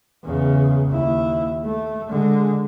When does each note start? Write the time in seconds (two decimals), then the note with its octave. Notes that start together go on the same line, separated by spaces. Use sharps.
0.24 E2 C#3
0.89 D#2 E4
1.65 A3
2.09 D3 G#3